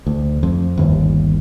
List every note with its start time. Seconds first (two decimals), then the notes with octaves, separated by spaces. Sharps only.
0.06 D2
0.43 F2
0.77 G1 D#2